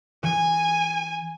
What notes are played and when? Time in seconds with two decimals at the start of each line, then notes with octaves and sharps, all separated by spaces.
0.24 E3 G#5